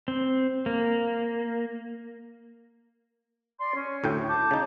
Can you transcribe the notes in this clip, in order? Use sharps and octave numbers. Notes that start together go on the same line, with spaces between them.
C4
A#3
D5 C6
C#4
D2 A2 G5
A5 D6 G6
C#3 D#4